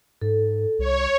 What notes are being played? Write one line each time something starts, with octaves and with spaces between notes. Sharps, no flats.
G#2 A4
C2 C#5